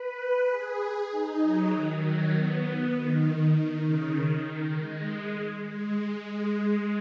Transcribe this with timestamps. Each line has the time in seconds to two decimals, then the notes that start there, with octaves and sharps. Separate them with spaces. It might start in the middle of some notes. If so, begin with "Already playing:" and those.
Already playing: B4
0.50 G#4
1.11 D#4
1.41 F#3
1.71 D#3
2.02 F#3
2.32 B3
2.93 D#3
3.54 D#3
3.84 C#3
4.15 D#3
4.45 D#3
4.76 G#3
5.67 G#3